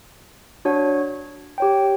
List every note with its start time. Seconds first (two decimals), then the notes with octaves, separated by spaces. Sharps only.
0.65 D4 F#4 C#5 F#5
1.58 G4 C#5 G5